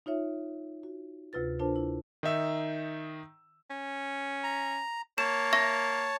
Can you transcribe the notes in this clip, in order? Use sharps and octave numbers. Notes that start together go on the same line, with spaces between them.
D#4 F4 C#5 E5
F#4
D2 C3 F4 B4 A6
D4 F4 A#4 C5 A5
E4
D#3 D#4 E5 E6
C#4
A#5
A#3 C#5 A5 E7
E5 C#6 A#6